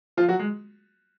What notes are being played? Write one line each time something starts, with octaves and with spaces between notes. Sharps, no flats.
F3 F4
F#3 F#4
G#3